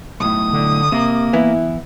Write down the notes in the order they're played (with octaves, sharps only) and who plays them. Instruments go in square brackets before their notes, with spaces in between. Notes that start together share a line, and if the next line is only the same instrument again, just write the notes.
[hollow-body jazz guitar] B1 A2 [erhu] D#6
[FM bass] D3
[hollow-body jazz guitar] C3 [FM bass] A#3
[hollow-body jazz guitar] E3 B3 E4